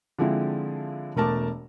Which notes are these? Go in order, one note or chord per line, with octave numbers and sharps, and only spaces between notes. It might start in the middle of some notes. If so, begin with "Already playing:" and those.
D3 F3 G#3 C4 E4
E1 B2 A3 A#4 A5 D6